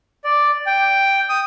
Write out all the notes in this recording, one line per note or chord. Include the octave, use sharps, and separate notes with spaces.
D5
G5
D#6